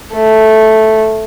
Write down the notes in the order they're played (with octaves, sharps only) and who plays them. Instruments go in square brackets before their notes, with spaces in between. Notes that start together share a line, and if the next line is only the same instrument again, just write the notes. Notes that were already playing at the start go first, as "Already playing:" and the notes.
[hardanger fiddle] A3